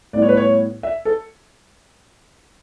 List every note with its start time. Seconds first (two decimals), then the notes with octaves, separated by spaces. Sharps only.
0.13 A2 G3 B3 E4 D5
0.22 C#5
0.29 B4
0.37 C#5
0.83 E5
1.05 A4